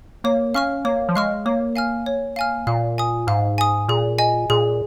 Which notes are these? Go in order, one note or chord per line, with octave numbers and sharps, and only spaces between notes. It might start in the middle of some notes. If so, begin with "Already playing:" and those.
A#3 C#5
C#4 F5 C#6 F6
A#3 C#5
F3
G#3 F5 C#6 F6
A#3 C#5
F5 G#5 F6
C#5
F5 G#5 F6
A#2 F5
G#5 D#6
G#2 F5
G#5 D#6
A#2 G#4
D#5 G#5
A#2 G#4